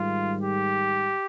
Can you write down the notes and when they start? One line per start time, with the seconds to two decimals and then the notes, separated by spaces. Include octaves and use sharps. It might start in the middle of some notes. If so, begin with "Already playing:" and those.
Already playing: G#2 D#3 G3 F4
0.43 G4